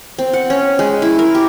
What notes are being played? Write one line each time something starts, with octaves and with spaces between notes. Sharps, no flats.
C4
F#5
C#4
G#3
E4
A#4
G4